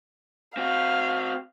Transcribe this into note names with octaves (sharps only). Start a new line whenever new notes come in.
C4 F#4 F5